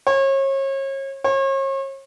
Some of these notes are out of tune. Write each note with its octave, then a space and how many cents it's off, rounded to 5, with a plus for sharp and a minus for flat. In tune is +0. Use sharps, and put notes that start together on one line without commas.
C#5 -35
C#5 -40